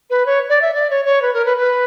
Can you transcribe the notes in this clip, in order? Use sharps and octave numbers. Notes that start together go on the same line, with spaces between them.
B4
C#5
D5
E5
D5
C#5
C#5
B4
A#4
B4
B4